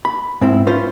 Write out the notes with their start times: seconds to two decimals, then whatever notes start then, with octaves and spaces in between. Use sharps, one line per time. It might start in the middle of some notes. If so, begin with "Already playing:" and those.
0.05 B5
0.41 G#2 C4 E4
0.67 C#4 F4 B4 C5